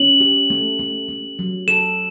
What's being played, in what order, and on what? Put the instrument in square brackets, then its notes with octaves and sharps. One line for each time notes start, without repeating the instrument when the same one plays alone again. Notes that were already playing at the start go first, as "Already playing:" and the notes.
Already playing: [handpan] C#4 [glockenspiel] F#7
[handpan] G4
A3
A3
A3
F#3
[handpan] A4 [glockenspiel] E7